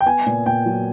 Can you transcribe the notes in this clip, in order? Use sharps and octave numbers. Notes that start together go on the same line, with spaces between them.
G5
B3 G#5
A#2
A#2 G5
F#3